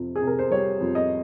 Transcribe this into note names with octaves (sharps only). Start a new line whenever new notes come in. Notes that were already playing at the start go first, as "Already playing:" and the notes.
Already playing: F2 C3
G#4
C3
A#4
C5
G3 C#5
F2
D#5